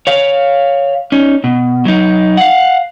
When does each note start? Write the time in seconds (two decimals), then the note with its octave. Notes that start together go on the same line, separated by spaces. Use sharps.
0.07 C#5 F5
1.12 C#4 D#4
1.44 B2
1.85 F#3 D#4
2.37 F5 F#5